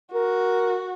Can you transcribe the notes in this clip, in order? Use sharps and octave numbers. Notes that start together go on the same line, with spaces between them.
F#4 A#4